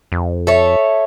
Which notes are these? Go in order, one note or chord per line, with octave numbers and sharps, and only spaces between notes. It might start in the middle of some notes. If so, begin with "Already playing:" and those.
F2
A4 C#5 E5